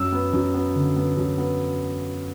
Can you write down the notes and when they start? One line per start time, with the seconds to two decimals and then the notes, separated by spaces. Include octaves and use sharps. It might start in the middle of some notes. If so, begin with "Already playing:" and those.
Already playing: F#2 E6
0.12 B3
0.33 F#2
0.54 B3
0.75 D3
0.96 B3
1.17 F#2
1.38 B3